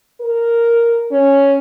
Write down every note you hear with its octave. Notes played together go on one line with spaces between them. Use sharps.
A#4
C#4